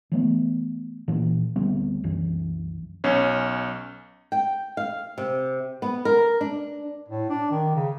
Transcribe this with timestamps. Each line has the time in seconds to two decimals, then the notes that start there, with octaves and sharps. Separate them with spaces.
0.12 E3 A3 B3
1.08 A#2 E3
1.56 D2 G3 B3 C4
2.04 C2 F#2 E3
3.04 B1 C#4 C#5
4.32 G5
4.77 F5
5.18 C3
5.82 B3
6.05 A#4
6.41 D4
7.09 A2
7.30 D4
7.51 D#3
7.76 C#3